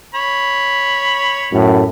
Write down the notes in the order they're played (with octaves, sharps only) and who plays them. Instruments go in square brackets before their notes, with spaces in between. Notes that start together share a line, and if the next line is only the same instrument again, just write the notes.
[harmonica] C#5 B5
[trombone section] F#2 A2